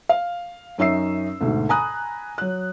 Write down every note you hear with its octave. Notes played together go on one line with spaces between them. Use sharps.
F5
F#2 C#4 D#4 E5 E6 C7
D2 G#2 B2
G#5 A#5 B5 D#6 F#6
F#3 F#6